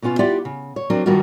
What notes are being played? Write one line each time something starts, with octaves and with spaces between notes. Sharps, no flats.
B2 B3 C#4 F4
E4 F4 G4 D5 F#5
C#3
C#5
F#3 A#3 C4 D4
G2 D#3 G3 A#3 F4 F#4